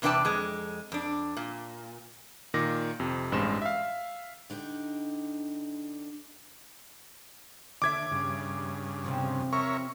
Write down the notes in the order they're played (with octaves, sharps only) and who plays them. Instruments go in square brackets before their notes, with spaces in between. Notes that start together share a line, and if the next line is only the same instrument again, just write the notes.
[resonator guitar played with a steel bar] E2 C3 D4 B4 G5 A5
F2 G#3
F2 D4
A#2
[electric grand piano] A#2 D#3 D6 A#6
F2 C3
A1 G2 G#3 C5 E7
E5 F5
[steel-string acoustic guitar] D3 D4 D#4 G4
[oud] D#2 G#4 E5 [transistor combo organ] D3 [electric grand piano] D6 G#6
[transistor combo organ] G2 C#3
[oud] E2 C3 F3
[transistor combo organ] A#4 C#5 E5 [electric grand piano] C#6